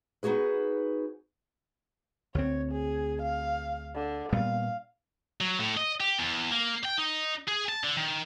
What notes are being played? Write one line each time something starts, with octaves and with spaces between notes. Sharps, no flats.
B3 D#4 F#4 G#4 B4
D2 C4 C#5
G#4
F5
D3
A#2 G3 B3 F5
F#3
A2
D#5
G4
E2
A#3
G5
D#4
G#4
A5
D3
D#3